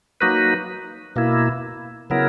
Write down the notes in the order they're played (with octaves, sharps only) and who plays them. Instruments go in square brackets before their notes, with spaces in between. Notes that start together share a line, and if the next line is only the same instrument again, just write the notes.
[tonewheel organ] F#3 A#3 D#4 F#4 B4
B2 A#3 E4
C#3 F#3 B3 E4 A#4